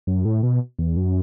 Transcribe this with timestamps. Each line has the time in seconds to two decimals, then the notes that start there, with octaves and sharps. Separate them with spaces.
0.07 F#2
0.25 A2
0.43 B2
0.79 E2
0.97 F#2